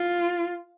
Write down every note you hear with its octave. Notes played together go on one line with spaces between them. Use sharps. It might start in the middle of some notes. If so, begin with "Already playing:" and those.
Already playing: F4